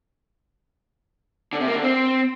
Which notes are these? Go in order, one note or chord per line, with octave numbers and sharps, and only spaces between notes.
D3
C3
A#3
D3
C4